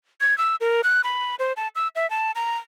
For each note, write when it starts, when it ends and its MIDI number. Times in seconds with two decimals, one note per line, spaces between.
0.21 0.37 92
0.38 0.56 88
0.61 0.81 70
0.84 1.01 90
1.04 1.35 83
1.39 1.53 72
1.57 1.68 81
1.75 1.88 88
1.96 2.09 76
2.10 2.31 81
2.35 2.57 82